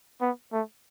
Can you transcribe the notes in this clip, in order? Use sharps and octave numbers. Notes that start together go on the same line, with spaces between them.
B3
A3